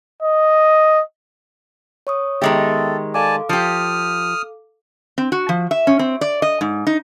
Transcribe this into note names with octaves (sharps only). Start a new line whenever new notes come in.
D#5
C#5 C#6 D#6
D#3 G#3 B3 G4 A4 E5
A4 D5 F5 G#5 A5 D6
F3 G4 D#6 F6
C4
F#4
F3
E5
C#4
C4
D5
D#5
G#2
D#4